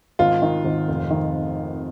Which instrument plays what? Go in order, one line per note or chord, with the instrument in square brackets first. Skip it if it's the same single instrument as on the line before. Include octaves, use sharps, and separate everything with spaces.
[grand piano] G#1 [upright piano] F4
[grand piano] D#3
G#1
F1
D#3